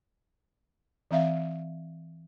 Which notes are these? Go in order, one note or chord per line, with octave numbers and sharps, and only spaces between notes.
E3 C4 E5 F5